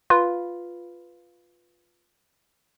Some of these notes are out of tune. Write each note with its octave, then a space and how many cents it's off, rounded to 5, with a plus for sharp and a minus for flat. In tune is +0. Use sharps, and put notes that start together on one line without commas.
F4 +0 B4 +0